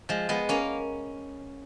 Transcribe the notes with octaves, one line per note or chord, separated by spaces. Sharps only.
F3 G#3
G#3 B3
A#3 C#4